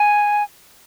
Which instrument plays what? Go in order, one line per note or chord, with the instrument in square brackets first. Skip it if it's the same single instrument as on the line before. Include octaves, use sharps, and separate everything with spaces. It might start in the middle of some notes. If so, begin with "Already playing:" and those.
Already playing: [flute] G#5